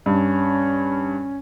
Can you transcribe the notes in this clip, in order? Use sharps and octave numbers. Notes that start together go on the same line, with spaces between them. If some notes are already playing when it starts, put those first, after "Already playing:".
G2 C#4